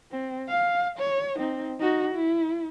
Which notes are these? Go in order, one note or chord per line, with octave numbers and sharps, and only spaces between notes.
C4
F5
C#5
C4 D#4
D#4 F#4
E4